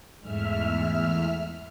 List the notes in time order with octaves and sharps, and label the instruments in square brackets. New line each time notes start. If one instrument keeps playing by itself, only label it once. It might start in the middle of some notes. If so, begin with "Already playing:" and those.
[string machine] E2 E5 F6 [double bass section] G#2 G#3 A3